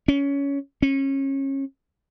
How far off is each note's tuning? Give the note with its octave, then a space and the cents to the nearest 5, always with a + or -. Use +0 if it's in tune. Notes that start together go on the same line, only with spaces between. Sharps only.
C#4 +15
C#4 -30